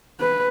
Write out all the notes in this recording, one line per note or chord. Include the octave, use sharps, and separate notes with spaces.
B4